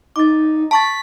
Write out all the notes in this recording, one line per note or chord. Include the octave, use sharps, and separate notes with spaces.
D#4 D6 A6
A5 C#6 A6 B6